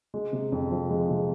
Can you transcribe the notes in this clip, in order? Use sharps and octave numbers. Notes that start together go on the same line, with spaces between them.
G#3
C3
F2
F3
G#3
C3